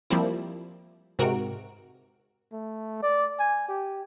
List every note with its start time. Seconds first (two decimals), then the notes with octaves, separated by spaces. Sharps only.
0.10 F3 G3 A#3 C4 E4
1.19 G#2 C3 F#4 A#4 D7
2.52 A3
3.02 D5
3.39 G#5
3.68 G4